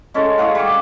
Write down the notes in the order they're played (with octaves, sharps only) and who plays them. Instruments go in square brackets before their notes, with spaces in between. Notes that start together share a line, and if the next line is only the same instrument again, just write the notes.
[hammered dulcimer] G#3 C#4 A4
F#4 G#4 F5 F#5
G3 D6